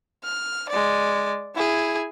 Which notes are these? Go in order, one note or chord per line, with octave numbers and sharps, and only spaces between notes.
F6
G#3 D5
E4 G#4